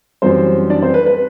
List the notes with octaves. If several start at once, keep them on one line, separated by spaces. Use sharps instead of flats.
F#2 E3 G3 C4 C5
D4 D5
C4 C5
B4
B4